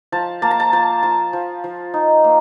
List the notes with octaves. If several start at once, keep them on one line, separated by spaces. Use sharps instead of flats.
F3 A5
A#3 A5
A#5
A5
F3 A5
F3 A5
F3
F3
D#4
A#3